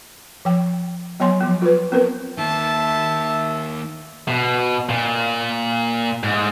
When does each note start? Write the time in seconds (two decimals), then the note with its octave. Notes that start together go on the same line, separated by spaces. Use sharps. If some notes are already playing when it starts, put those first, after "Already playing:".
0.45 F3 G5
1.20 F#3 B3 C#5 G#5 C6
1.41 F3 B3
1.62 F4 B4
1.92 B3 C4 A#4 B4
2.38 D#3 A#3 E5 A5
4.28 B2
4.89 A#2
6.23 G#2